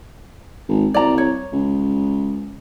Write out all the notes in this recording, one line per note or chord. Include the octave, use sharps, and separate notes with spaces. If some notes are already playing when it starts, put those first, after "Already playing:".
G#1
C2 D5 A#5
C#5
C#2